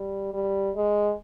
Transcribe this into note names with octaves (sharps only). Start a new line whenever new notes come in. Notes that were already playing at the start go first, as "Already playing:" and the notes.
Already playing: G3
G3
G#3